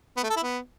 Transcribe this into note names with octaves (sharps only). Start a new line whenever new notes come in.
B3
A3
A4
E4
B3